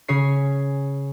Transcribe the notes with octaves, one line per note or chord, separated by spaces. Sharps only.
C#3 C#4 C#5 C7